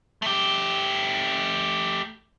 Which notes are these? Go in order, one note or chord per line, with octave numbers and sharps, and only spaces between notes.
A3 G4